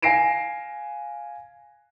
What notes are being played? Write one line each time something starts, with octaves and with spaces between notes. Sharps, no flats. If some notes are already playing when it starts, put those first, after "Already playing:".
F5 G#5 A#6 C7 D7 E7